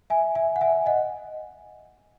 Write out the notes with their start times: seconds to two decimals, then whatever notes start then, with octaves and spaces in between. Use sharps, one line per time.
0.10 E5 G#5
0.35 E5 G#5
0.56 F#5
0.61 E5 G#5
0.86 D#5 F#5